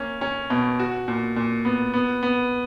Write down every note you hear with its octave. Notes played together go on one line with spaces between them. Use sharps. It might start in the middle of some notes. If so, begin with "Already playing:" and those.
Already playing: A#3 C#4
C#4
B2
F#4
A#2
A#2
B3
B3
B3